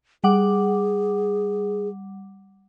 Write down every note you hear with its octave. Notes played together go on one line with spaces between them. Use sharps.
G3 G#4 F#5 D6